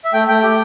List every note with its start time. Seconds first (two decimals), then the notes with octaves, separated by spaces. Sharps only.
0.05 E5
0.13 A3 G5
0.28 A3 G5
0.43 G4